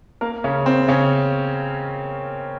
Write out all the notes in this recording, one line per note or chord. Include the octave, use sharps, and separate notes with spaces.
A#3 A#4
C#3 C#4
C4
C#3 C#4